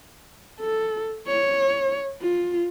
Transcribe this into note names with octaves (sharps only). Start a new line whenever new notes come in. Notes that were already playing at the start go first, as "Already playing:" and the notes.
A4
C#5
F4